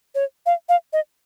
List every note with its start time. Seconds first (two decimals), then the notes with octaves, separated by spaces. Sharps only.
0.15 C#5
0.46 F5
0.69 F5
0.93 D#5